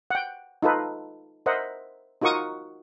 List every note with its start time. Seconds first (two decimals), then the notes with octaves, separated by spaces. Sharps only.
0.11 F#5 G5
0.63 D#4 F4 A4 B4
1.46 A#4 C5 D#5 E5 F#5
2.22 D#4 F4 F#4 A#4 C#6 D#6